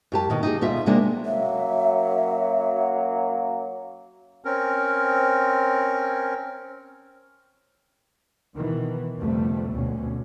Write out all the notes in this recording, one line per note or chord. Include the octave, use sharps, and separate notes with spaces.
F#2 G4 A5
B2 D#3
D#4 G4 G#4
D2 B2 F4 E5
C3 G#3 A#3 D4
F#2 F#3 A#3 E5
C4 C#4 A#4
B2 D#3 E3
G1 F2 C3 G3 A3
D2 B2 C#4